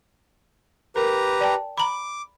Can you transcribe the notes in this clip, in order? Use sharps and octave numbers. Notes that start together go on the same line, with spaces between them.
G4 A#4 B4 A#5
D5 G5 A5
A#5 B5 D6